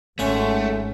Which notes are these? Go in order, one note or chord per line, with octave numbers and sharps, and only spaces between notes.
G#1 F#2 A3 C#4 G#5 A5